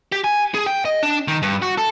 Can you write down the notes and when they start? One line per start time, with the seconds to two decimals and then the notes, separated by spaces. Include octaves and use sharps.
0.12 G4
0.24 G#5
0.54 G#4
0.66 G5
0.85 D#5
1.03 D4
1.28 D#3
1.42 G2
1.62 F#4
1.78 A4